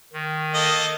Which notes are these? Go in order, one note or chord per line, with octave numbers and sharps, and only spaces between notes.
D#3
A#3 A4 D#5